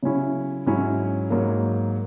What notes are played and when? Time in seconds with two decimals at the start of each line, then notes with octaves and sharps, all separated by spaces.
0.03 C#3 F#3 C#4 E4
0.66 G#2 F#3 C#4 E4
1.30 G#2 F#3 A#3